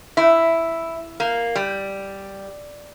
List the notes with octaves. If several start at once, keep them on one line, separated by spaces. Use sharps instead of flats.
E4
A#3
G3